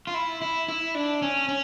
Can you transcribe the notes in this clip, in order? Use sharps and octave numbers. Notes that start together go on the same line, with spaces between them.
F4
E4
E4
E4
D4
C#4
C#4